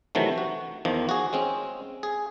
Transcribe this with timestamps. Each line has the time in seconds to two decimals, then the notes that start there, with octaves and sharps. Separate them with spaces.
0.15 C3 D#3 E3 F#3 A3
0.38 F#4
0.85 E2 D#3 F3
1.09 F#4 G#4
1.33 G#3 C4 C#4
2.03 G#4